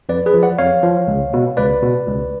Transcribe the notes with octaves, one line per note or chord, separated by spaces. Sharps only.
F2 B4 D5
G#4 B4
F3
D5 F#5
F2 C#5 F5
F3
C#2
B2
C#2 B4 D5
B2
C#2